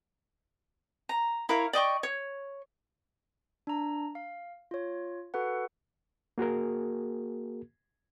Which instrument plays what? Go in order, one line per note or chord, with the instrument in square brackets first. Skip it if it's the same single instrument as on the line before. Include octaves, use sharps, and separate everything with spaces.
[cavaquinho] A#5
E4 A#4 C#5 F5
D5 D#5 G5 C#6
C#5
[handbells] D4 A#5
F5
F4 C#5
F#4 A4 B4 F#5
[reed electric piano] A#3 F#4 G#4 A#4